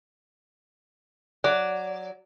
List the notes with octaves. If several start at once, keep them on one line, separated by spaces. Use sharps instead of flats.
F#3 D5